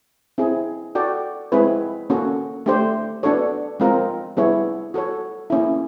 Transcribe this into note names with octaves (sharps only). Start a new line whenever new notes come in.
C4 E4 G#4
F#4 A4 D5 G5
G#3 C4 E4 G#4 B4
A#3 C#4 F#4 A4
A3 D4 G4 C5
B3 D4 F#4 A4 C#5
G#3 C4 F4 A#4
G3 B3 E4 G#4 C#5
F#4 A4 C#5
A#3 C#4 E4